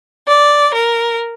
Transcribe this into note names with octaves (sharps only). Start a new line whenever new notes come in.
D5
A#4